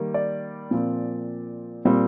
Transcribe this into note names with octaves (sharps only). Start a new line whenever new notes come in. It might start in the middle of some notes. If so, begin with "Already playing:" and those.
Already playing: D#3 G3 A#3
D5
A#2 F3 C4
A#2 G3 C4